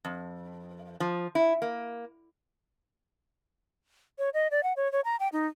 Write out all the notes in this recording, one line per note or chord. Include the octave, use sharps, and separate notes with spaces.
F2
F3
E4
A#3
C#5
D#5
D5
F#5
C#5
C#5
A#5
G5
D#4